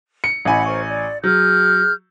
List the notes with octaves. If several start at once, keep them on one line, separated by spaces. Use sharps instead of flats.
C#7
A1 D#5 F#5 G#5 B5
A#4 C5 C#6
D5
F#3 G#4 F6 G6